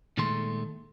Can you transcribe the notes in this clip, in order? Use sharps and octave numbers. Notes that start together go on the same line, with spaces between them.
A#2 D#3 G#3 A3 A4 C6